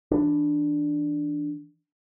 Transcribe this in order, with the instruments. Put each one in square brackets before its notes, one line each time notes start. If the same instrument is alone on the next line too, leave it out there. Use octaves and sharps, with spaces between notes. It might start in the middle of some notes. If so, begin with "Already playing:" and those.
[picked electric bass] E3 D4